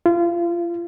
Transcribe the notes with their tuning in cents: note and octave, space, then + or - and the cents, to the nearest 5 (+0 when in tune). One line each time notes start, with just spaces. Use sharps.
F4 -30